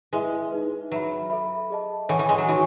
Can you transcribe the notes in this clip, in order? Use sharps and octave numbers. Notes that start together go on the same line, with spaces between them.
G#3 E4 G#4 B4 E5
D#4 G#4 B4
F#3 B4 E5 B5
A4 E5 B5
G#4 D#5 A5
E3 A4 C#5 F#5 C#6
E3
G#3
F#3
E3 D#4 F#4 C#5 G#5 C#6